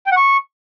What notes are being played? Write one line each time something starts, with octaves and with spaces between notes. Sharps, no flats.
G5
F#5
C#6